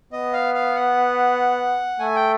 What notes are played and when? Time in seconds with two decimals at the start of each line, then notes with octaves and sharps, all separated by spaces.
0.13 B3 D#5
0.33 F5
0.54 F5
0.76 F#5
1.99 A3 G#5
2.16 G5